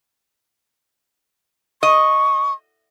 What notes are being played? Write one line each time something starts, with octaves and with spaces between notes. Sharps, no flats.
D#5 C#6